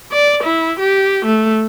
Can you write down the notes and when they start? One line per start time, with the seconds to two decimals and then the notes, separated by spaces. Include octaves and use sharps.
0.12 D5
0.43 E4
0.80 G4
1.25 A3